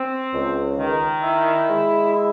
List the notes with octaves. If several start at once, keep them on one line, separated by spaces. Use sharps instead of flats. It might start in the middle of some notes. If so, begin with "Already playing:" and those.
Already playing: C4
C#2
D#3
E4
G#3
E4